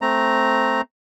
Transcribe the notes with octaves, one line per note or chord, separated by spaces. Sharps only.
A3 C4 A#5